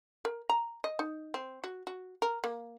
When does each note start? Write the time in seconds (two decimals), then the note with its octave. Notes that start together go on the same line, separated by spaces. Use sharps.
0.25 A#4
0.49 A#5
0.84 D#5
0.99 D#4
1.34 C4
1.64 F#4
1.87 F#4
2.22 A#4
2.44 A#3